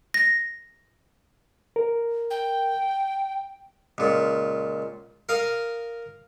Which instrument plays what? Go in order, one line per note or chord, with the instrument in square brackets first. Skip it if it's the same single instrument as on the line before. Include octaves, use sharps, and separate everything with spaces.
[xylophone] A#6
[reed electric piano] A#4
[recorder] G5
[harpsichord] C#2 A#2
A#4 F5 D#6